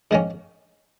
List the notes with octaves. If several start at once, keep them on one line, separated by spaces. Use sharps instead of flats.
G#2 D#3 A#3 C#4